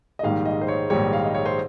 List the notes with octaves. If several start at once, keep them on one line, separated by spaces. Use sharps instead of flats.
D#5
A#1 G#2 D#3 G3 F5
D#5
C5
C#5
A#1 G#2 D#3 G3 C#5
F5
D#5
C#5
C5